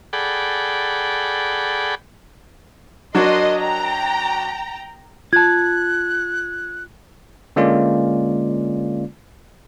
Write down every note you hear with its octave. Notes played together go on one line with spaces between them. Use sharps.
G#4 A4 D5 F#5 G5 B5
F#3 D4 F#4 A#4 D#5 C6
G5 A#5
F4 A5 F#6 G#6
D3 G#3 A#3 C#4 F4 D5